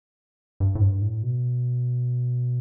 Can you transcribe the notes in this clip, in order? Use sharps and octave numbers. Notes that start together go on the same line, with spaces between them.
G2
A2
G2
A2
B2